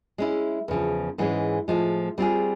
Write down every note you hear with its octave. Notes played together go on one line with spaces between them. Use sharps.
G#3 C#4 E4
E2 C#3 F3
G#2 E3 G#3 C#4
A2 F3 G#3
G3 C4 F4 G#4